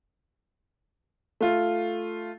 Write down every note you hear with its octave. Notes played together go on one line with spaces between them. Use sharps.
A3 F4